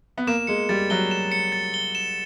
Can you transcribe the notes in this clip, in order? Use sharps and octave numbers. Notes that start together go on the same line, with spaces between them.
B3
A#3 E7
G#3 C#7
G3 A6
F#3 G7
E7
C#7
A6
G7
E7